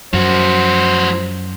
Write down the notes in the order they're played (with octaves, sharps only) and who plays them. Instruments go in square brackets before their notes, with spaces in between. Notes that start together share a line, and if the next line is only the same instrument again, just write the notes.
[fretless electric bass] F#2 [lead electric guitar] F3 F#4 [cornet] C5